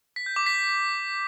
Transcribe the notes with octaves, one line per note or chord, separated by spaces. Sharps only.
B6
G6
D6
B6